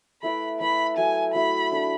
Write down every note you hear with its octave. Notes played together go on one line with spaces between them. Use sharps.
A3 E4 B4 D5 B5
A3 E4 B4 D5 B5
F#3 A3 E4 G#5
F#3 A3 E4 B5
D4 A4 D5